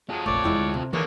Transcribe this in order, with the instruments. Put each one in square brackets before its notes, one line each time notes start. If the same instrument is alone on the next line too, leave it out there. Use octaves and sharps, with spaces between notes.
[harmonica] F#3 G#3 [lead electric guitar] F4 A4
[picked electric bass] F1 A#1 [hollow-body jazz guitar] A3 [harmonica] C#5 D5
[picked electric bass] F1 E2 [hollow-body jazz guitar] G#3 E4 G5
[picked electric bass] D2
[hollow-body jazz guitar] C3
[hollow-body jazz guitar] D#2 [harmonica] D3 G#3 C#5 [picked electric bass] E3 [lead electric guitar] A#3